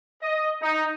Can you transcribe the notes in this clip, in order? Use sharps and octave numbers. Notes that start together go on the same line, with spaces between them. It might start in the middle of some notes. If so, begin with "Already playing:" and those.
D#5
D#4